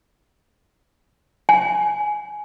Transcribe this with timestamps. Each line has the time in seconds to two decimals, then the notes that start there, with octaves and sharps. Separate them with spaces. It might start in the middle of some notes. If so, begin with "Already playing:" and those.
1.49 G#5